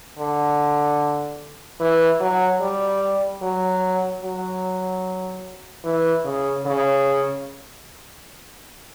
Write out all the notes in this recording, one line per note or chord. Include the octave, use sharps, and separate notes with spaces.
D3
E3
F#3
G3
F#3
F#3
E3
C#3
C#3